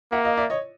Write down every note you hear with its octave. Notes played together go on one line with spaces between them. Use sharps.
A#3 E5 F#5
D#5 F5
D5 E5
C#5 D#5